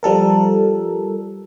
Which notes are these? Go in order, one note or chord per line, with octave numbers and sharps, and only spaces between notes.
F3 G3 A4 A#4